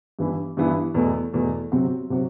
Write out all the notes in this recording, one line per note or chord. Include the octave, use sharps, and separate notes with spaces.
G2 E3 B3 E4
G2 E3 B3 E4
E2 B2 A3
E2 B2 A3
C3 F#3 C4 F#4
C3 F#3 C4 F#4